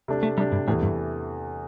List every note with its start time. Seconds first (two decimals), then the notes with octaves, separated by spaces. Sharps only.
0.08 C3 A3 D4
0.23 A3
0.37 C3 G3 A3 D4
0.52 G2
0.68 E2 A2 C3 E3 A3
0.82 G2